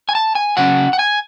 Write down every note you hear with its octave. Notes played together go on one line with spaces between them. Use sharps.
G#5
A5
G#5
C#3 F#3 C#4 F#5
F#5
G#5